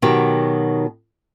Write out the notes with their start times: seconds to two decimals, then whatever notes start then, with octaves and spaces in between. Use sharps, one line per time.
0.02 B2 D#3 F#3 G4